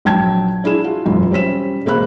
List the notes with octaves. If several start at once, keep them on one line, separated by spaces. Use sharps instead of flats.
A#1 F#3 G5 A5 G#6
D4 E4 G#4 E7
F4 F#4
E1 F#2 F4
G3 C#4 C5 B6 E7
E1 G#3 A#3 C5 B5 F#6